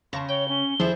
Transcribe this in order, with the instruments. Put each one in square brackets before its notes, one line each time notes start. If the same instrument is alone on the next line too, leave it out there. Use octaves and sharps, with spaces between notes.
[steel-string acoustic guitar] C#3 [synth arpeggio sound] A5 C#6 A#6 [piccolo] C6
[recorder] C#5 [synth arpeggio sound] G5 [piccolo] G7
[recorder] C#4
[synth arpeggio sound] F3 [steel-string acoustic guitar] G3 E4 G#4 [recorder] C5